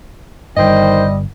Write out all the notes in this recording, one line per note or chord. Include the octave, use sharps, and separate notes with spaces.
G1 G2 D#3 G3 C5 D#5 G5